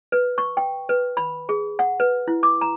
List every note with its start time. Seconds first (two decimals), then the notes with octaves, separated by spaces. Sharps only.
0.12 B4
0.38 C#6
0.57 G5
0.89 B4
1.17 B5
1.49 G#4
1.79 F#5
2.00 B4
2.28 E4
2.43 D6
2.61 A#5